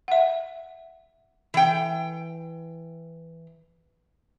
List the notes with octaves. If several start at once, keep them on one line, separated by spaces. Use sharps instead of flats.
E5 F#5
E3 G5